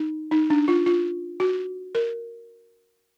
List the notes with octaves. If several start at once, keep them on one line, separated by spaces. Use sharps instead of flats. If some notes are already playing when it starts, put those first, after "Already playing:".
Already playing: D#4
D#4
D4
F4
F4
F#4
A#4